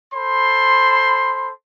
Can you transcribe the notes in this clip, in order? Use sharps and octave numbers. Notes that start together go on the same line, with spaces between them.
A4 C5 B5 C6